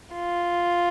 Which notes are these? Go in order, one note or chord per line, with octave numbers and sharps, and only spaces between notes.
F4